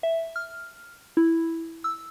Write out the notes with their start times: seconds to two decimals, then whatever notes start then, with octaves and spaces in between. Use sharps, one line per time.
0.03 E5
0.36 F6
1.17 E4
1.84 E6